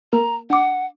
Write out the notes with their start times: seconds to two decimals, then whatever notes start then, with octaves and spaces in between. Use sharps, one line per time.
0.13 A#3 A#4 A#5
0.50 D4 F#5 D6